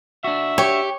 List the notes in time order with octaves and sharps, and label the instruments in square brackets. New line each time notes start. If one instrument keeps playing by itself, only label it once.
[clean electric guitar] D4 F#4 [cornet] E5
[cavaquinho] G4 [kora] C#5